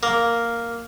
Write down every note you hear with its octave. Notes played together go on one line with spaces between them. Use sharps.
A#3